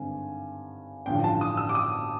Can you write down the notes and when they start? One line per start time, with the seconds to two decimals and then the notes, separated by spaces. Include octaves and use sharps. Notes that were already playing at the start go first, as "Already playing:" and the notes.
Already playing: G#1 G2 D3 G#5
1.06 A1 G2 D3 F3 G5
1.24 A5
1.41 D#6
1.57 E6
1.69 D6
1.75 D#6